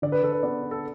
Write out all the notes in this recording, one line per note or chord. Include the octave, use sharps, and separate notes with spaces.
D3 D5
B4
D3 A4
B4
B3 D5
D4
A4